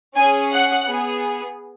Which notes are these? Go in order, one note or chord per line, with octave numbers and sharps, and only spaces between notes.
C#4 G#4 G#5
F#5
B3 G#4